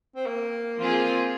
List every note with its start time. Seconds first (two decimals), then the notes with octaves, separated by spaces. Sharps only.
0.16 C4
0.26 A#3
0.77 F3 C4 F4 G#4